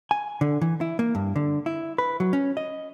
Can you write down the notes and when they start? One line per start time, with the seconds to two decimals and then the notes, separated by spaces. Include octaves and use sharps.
0.11 G#5
0.41 D3
0.61 E3
0.81 E4
0.99 A#3
1.15 G2
1.36 D3
1.66 E4
1.98 B4
2.20 F#3
2.33 C#4
2.57 D#5